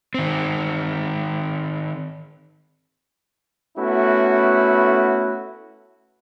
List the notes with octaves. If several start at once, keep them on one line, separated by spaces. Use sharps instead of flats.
D#3 C4
A3 B3 C#4 E4 F#4